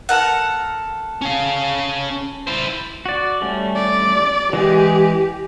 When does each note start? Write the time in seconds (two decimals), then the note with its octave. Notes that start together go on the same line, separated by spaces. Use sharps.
0.09 A4 A#4 F#5
1.22 C#4 F5
2.47 E4 C5
3.06 F#4 D5
3.41 G3 A3 C#4
3.76 D5
4.53 E3 G#3 G4 G#4